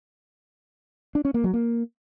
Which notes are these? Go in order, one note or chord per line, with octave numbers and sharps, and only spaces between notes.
D4
C#4
A#3
F#3
A#3